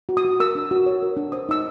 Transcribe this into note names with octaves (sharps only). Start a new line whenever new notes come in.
F#4
D#6
F#4
A#4 E6
D4
F#4
C#5
A#4
D4
C5 D#6
D#4 E6